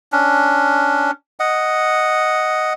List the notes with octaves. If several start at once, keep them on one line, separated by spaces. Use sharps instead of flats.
C#4 D4
D#5 F#5